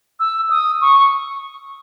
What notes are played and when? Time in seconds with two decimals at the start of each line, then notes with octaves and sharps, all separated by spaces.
0.20 E6
0.50 D#6
0.81 C#6